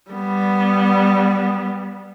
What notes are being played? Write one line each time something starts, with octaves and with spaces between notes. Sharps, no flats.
G3 B3